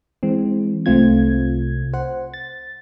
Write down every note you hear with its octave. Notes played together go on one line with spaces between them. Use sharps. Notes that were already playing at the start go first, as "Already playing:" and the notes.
E3 G#3 C4
C2 C3 A3 C4 F4 G#6
C5 F#5
A6